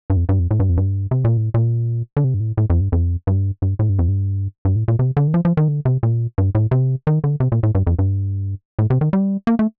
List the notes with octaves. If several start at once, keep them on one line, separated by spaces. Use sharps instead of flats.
G2
F2
G2
F2
A2
G2
F2
G2
C3
A#2
A2
A#2
D3
C3
G2
A2
A2
F2
G2
F2
G2
G2
A2
G2
F2
G2
G2
A2
A#2
C3
D3
D#3
F3
F3
D#3
D3
C3
A#2
G2
A2
C3
D#3
D3
C3
A#2
A2
G2
F2
G2
A2
C3
D#3
G3
A#3
A3